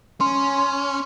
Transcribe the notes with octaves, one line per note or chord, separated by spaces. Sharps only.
C#4 C6
C6